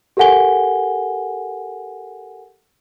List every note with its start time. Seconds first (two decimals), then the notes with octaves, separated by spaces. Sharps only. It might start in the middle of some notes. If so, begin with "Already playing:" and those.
0.17 G4 A4 A#4 F#5 G#5 G7